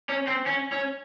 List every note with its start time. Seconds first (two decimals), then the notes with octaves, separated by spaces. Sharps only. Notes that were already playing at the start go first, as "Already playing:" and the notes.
0.09 C#4
0.28 C4
0.47 C#4
0.72 C#4